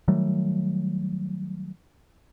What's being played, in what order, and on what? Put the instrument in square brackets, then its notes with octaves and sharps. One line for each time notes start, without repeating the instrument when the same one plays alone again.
[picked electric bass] D#3 F#3 G3 A3